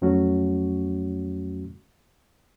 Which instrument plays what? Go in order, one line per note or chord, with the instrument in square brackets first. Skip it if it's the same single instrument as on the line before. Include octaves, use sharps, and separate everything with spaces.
[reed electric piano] F2 F#3 A3 C#4 F#4